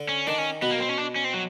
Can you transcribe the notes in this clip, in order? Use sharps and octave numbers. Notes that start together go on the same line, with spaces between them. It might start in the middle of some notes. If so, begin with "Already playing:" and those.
Already playing: D3
C#4
D#3 D4
C#4
B2 B3
A#3
C4
C#4
D4
C#4
C4
F#3